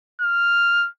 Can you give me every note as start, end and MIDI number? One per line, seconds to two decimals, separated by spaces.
0.21 0.88 89